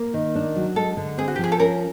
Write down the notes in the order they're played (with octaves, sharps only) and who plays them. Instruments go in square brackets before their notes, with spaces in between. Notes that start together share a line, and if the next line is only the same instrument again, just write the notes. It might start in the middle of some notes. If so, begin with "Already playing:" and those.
Already playing: [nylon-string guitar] A#3
D#3
D4
F#3
[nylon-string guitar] G#3 [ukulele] A4
[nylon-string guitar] D3
[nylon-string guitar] C4 [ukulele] G#4
[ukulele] F#4
G4
[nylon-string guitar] F3 [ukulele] G#4
[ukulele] A4
[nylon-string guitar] C#4 [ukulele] A#4